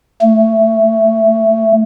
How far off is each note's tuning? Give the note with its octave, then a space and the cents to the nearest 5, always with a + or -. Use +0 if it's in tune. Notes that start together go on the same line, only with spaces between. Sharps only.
A3 +15